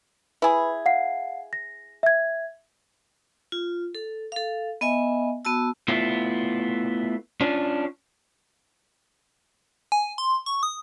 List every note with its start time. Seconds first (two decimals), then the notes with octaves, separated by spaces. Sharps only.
0.42 E4 G#4 B4 B5
0.86 F5 F#5 C7
1.53 A#6
2.03 E5 G#6
3.52 F4
3.95 A4
4.32 A4 F5
4.81 B3 D#5 E5 G#5
5.45 B3 F#4 A5 E6
5.88 A3 B3 E4 F4
7.41 C#4 D4 F4
9.92 G#5
10.18 C6
10.46 C#6
10.63 D#6